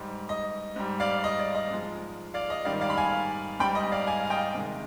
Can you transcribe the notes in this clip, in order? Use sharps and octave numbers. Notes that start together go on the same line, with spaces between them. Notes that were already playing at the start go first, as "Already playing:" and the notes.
Already playing: G#2 G3
D#5
G#2 G3
D5 F5
D#5
D5
D#5
G#2 F3 G#3
D5 F5
D#5
G#2 D#3 G3 D5 F5
D5 F5
B5
F5 G#5
G#2 G3 G5 B5
D#5
D5 F5
F5 G#5
F5
D#5 G5
C3 D#3 G#3